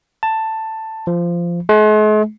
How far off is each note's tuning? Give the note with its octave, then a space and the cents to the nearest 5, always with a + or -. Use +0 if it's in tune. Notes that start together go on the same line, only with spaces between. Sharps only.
A5 +10
F3 -15
G#3 +45